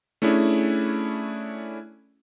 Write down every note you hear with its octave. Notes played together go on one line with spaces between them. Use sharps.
A3 C#4 D4 E4 G#4